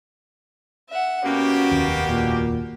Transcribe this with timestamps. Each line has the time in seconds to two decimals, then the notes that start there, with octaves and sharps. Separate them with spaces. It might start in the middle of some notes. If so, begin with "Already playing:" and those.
0.90 E5 F#5
1.25 B2 A#3 C#4 F#4 G4
1.71 F1 D#2
2.09 A#2